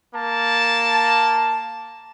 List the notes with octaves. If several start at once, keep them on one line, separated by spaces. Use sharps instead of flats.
A#3 A5